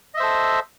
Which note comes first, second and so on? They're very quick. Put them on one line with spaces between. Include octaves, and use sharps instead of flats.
D#5 E5 C5 A4